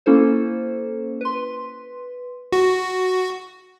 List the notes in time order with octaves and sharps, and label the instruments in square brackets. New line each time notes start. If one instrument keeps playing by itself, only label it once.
[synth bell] A#3 C#4 E4 A4 C5
B4 C6
[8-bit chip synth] F#4